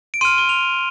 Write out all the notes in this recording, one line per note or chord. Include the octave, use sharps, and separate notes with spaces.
D7
C6 F6 D#7
G7
F7